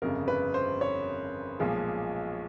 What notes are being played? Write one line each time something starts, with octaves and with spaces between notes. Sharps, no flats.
G1 F2 C#3 A#4
B4
C5
C#5
B1 A#2 F3 G#3